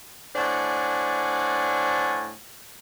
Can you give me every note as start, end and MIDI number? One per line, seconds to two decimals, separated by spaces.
0.35 2.32 45
0.35 2.32 62
0.35 2.32 72
0.35 2.32 78
0.35 2.32 80